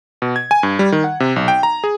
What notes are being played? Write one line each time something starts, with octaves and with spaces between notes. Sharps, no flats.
B2
G#6
G#5
G2
G3
D#3
F#5
C3
B1
G5
A#5
G#4